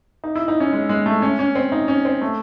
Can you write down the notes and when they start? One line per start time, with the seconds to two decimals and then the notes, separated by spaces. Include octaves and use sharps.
0.24 D#4
0.36 E4
0.48 D#4
0.60 C#4
0.73 G#3
0.89 G#3
1.06 A3
1.22 C#4
1.39 C#4
1.55 C4
1.72 D#4
1.88 C#4
2.05 C4
2.21 A3